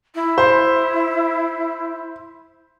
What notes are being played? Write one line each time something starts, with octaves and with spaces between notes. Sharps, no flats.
E4
C5